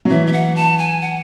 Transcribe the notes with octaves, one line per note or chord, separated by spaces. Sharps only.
F#3
E3 E5
E5
F#5
A5
G#5
F#5